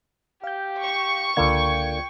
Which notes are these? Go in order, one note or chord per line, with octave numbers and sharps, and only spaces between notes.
G4 F5 G6
C#6
C#2 D3 A#3 F4 G5 G#6